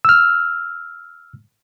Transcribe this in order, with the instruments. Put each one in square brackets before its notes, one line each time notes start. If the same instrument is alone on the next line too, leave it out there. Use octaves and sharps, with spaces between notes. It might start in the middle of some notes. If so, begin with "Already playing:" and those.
[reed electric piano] E6 F6